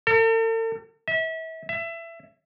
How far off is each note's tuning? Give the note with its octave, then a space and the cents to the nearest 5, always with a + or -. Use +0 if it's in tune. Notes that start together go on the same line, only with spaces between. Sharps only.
A4 +45
E5 -35
E5 +20